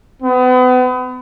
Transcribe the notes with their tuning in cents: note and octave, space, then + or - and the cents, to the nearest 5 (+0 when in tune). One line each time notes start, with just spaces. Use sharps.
B3 +35